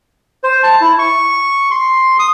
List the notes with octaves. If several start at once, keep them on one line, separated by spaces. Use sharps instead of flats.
C5
A5
E4
C#6
C6
D#6